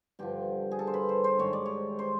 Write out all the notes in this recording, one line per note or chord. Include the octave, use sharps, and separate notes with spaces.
G2 D3 F3 G4
G#4
A4
C5
B4
C5
C5
G#2 D#3 G3 C#5
D5
C#5
C5